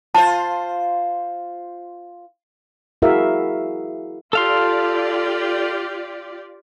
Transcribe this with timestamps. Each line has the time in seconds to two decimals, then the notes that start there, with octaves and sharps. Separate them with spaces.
0.15 F4 C5 A5
3.02 E4 F#4 G#4 A#4 E5 F5
4.33 F4 G4 A4 D5 F5 C6